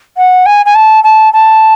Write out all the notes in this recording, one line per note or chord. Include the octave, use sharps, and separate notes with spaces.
F#5
G#5
G#5
A5
A5
A5